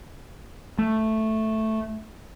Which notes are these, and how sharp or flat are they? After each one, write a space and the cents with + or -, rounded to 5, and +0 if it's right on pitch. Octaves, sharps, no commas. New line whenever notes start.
A3 +0